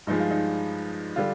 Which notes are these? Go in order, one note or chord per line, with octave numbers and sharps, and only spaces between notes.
G2 F3 G#3 D#4
F4
D#4
D3 G3 F4